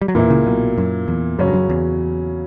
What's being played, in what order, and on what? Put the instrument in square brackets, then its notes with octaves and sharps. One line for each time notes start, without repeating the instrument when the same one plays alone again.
[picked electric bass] G3
F#3
[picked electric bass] E2 E3 [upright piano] A#2 A#3 E4
[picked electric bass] C#2 C#3
B1 B2
F#2
E2
[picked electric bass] F#2 [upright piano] C#3 F#3 C#4
[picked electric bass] G2
F#2
E2